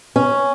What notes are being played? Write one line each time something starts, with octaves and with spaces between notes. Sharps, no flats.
C#4